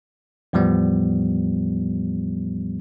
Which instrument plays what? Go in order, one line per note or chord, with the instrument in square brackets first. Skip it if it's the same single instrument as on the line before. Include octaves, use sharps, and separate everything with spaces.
[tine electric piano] E2 A2 F3 G3 B3